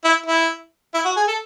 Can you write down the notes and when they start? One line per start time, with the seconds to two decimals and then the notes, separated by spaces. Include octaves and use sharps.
0.04 E4
0.27 E4
0.94 E4
1.05 F#4
1.17 G#4
1.28 A4